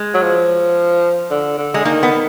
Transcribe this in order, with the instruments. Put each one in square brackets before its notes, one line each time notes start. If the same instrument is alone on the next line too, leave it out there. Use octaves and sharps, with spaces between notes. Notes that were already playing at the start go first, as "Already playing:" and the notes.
Already playing: [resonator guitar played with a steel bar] G#3
[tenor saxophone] F#3
F3
D3
D3
[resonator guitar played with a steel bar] G#3
[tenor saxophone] D#3 [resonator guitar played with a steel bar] A#3
[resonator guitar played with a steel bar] B3